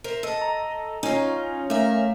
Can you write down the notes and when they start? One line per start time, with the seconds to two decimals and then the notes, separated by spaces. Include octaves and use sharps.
0.04 A#4 C5 E5
0.23 A4 D#5
0.42 A#5
1.03 C#4 D#4 F4
1.70 A3 A#4 E5 F5